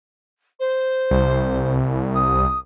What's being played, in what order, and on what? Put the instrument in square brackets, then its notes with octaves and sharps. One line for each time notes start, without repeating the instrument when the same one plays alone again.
[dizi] C5
[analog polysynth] C2
[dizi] D#6